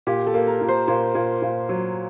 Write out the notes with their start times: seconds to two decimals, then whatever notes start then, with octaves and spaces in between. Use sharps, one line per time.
0.07 A#2 G4
0.27 A4
0.34 A#3
0.47 A#4
0.61 A#2
0.68 C5
0.88 A#2 C5
1.15 A#2
1.42 A#2
1.69 F#3